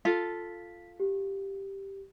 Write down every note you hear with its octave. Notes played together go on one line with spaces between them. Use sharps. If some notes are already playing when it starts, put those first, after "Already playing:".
F4 A4 B6
G4